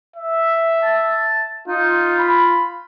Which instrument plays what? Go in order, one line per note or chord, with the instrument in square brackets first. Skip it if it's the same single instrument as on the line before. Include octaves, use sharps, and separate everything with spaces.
[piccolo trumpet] E5
[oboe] A5
[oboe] D#4 [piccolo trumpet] F4
[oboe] B5